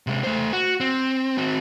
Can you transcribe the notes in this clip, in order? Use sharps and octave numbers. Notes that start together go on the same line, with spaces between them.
C3 G#3
A3 C5
F#4
C4
C4 F#4